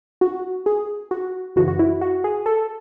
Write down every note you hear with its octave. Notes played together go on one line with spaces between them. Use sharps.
F#4
G#4
F#4
F#2 C#3 E3 F#4
F#4
E4
F#4
G#4
A4